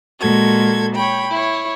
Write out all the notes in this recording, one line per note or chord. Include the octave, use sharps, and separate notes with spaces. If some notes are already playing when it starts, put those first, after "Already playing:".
A#2 G#3 F#4 A4 G#6
C#5 G5 B5
E4 C#5